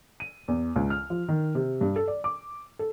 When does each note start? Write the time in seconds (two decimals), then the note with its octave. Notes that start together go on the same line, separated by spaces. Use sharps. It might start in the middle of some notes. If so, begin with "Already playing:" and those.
0.20 D#7
0.48 E2
0.76 C#2
0.90 F6
1.10 F3
1.29 D#3
1.55 C3
1.81 G2
1.96 A4
2.08 D5
2.24 D6
2.79 A4